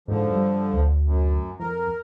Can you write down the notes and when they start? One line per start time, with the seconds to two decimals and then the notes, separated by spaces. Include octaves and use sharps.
0.08 G#2 D3 F3
0.32 G2
0.74 D2
1.05 F#2
1.59 F2 A#4